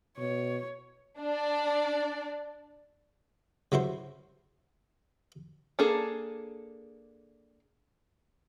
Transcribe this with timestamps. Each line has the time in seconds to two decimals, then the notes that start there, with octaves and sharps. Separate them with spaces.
0.18 B2 C#5
1.20 D4 D5
3.72 C#3 F#3 E4 C5
5.79 A#3 D4 G#4 A4